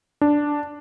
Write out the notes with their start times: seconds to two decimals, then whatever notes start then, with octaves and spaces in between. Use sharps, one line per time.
0.21 D4